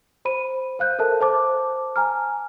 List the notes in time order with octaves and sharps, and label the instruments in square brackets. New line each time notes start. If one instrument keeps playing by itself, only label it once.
[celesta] C5 B5 D#7
C5 F5 F#6 G6
A4 A#4 E5 A5
C5 A5 D6
G#5 A#5 F6